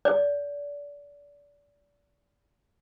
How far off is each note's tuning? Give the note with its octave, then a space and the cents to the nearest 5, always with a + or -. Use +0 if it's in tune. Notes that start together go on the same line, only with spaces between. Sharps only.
D5 -30